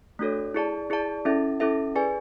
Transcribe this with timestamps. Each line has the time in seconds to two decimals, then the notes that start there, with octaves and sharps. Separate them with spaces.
0.19 A3 D4 F#4 A4 C#5
0.54 E4 G#4 D5 A5
0.90 E4 G#4 D5 A5
1.25 C#4 E4 A4 E5
1.60 C#4 E4 A4 E5
1.95 G#4 B4 D5 G#5